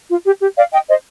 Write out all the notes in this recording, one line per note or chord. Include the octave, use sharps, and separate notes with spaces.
F4
G4
G4
D5 F5
D#5 G5
C5 D#5